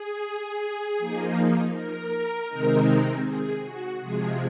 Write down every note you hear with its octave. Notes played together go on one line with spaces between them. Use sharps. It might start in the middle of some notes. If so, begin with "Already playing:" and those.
Already playing: G#4
F3 A#3 D#4
A#4
C3 D#3 G#3 C4 D#4
G#4
F#4
C3 F3 G#3 G#4